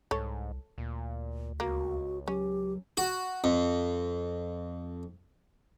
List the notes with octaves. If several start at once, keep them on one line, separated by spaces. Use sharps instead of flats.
C2 G#2 A4 C#5
D2 A#2
C#2 A#3 F#4
F#3 C#4 G4
F#4
F2